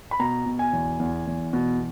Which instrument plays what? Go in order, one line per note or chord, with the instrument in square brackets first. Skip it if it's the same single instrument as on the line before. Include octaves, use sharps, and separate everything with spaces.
[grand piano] B5
B2 A#5
B2
G#5
E2
E2
E2
B2